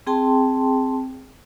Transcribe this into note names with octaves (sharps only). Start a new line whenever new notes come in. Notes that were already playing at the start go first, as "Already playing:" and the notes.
C4 G#4 G5 A5 C6